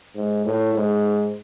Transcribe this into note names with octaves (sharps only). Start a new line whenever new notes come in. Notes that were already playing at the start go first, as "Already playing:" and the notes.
G#2
A2
G#2